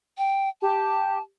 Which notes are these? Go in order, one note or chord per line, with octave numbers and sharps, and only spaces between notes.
G5
G4 A5